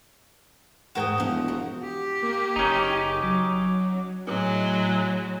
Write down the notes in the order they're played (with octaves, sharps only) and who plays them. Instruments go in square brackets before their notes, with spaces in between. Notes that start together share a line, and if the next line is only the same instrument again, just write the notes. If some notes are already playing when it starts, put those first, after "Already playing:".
[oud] E2 G#2 A#4 [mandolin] F#4 G5 D#6
[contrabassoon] E1 [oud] D#2 F3
[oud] F#4
[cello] G4
[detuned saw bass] A#3 [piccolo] D6
[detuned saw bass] F#1 [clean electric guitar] C#4 D#4
[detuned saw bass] F#3
[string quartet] A2 F#3 G#3